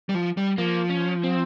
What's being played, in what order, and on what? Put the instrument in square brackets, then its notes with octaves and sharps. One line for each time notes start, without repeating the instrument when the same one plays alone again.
[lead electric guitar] G3
F3
G3
[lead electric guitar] F3 [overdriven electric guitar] A#3
[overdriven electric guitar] C#4
C4